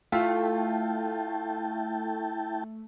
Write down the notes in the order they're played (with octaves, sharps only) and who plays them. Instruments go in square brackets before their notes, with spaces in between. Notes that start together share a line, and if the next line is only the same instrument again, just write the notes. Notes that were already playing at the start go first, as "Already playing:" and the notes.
[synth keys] A3 [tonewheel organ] E4 G5 A5 [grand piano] F4